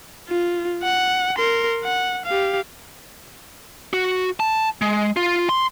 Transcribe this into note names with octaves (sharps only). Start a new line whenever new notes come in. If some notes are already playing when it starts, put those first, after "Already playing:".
F4
F#5
A#4 C6
F#5
G4 F5
F#4
A5
G#3
F4
C6